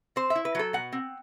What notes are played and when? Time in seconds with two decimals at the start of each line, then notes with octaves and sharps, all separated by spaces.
0.16 C4 C5
0.30 E5
0.35 E4
0.45 B4
0.55 F#3 A4
0.73 B2 F#5
0.92 C4